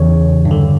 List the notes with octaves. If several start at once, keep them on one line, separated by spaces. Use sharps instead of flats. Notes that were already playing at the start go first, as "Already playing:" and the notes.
Already playing: E2 C#3 E3 C#5
G2
D3